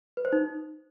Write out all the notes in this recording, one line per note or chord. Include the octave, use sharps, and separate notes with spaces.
B4
C5
D#4